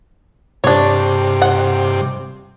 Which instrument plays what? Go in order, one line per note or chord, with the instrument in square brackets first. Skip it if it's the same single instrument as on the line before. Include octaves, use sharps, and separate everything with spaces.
[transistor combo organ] G2 C3 [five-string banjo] D4 C#5
[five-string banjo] F#5